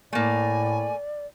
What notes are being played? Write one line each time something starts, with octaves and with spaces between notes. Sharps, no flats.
A2 A3 A#3 D5 G#5